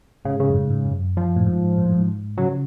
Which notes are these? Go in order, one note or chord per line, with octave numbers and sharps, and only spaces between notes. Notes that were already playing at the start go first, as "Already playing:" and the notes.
G#2 C#3
C#3
F#2
G#2
G#2
F#2
F3
A2
G#2
G#2
A2
G#2
C#3 F#3